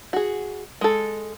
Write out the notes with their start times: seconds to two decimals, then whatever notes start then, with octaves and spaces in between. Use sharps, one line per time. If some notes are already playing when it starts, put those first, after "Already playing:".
0.13 F#4 G#4
0.81 G#3 A4